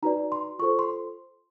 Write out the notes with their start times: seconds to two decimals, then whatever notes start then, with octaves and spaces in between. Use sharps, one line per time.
0.03 D#4 F#4 B4 D5 A#5
0.32 C6
0.59 F4 A4 C5 C#6
0.79 C6